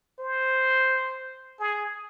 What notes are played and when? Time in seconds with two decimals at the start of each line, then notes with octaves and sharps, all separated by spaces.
0.19 C5
1.60 G#4